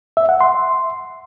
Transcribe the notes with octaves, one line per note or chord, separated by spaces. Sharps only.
E5
F#5
C6